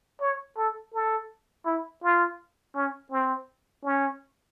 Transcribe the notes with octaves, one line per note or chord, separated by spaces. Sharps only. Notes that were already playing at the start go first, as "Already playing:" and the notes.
C#5
A4
A4
E4
F4
C#4
C4
C#4